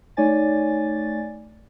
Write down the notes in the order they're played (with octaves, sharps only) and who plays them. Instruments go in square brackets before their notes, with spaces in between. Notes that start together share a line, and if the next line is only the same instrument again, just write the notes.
[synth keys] A3 D#4 C#5 D5 G#5 A6